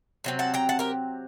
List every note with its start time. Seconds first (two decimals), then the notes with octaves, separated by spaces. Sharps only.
0.24 C3 F#3 C4
0.39 F#5 A5
0.54 G5 A#5
0.69 F#5 A5
0.79 G4 A#4